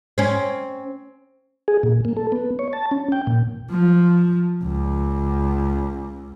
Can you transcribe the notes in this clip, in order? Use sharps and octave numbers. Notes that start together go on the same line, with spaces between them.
C4 C#4
G#4
A#2
A#3
A4
B3
C#5
A5
C#4
G5
A#2
F3
C#2